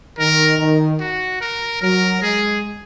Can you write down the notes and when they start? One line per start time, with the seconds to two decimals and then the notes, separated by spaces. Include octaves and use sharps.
0.19 D#3 A#4
0.59 D#3
1.00 F#4
1.41 A#4
1.82 F#3 A#4
2.21 G#3 G#4